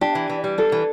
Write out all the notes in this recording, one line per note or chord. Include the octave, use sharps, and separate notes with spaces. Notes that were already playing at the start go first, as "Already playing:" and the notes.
D4 G4
E3
E3
G3
D4 A4
E3